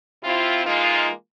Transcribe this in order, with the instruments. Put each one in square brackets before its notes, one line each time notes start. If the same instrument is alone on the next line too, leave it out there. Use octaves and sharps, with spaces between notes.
[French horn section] C3 C4 E4 F4
E3 G#3 A#3 D#4 F4